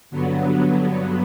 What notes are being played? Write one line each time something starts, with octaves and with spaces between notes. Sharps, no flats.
G2 D3 F#3 B3